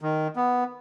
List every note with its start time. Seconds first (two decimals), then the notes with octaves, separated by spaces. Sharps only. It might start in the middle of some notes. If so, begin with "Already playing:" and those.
0.01 D#3
0.36 B3